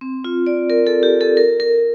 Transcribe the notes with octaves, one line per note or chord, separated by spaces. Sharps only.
C4
F4
D5
A#4
A4
G4
A4
A#4
A#4